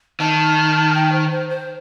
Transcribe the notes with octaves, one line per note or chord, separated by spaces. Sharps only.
D#3 A5
G5
C5
C5
C5